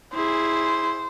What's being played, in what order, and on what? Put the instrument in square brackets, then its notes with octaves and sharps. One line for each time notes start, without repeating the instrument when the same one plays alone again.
[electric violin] E4 G#4 [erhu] C5